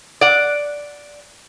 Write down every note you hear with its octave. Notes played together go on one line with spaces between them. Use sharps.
D5 F#5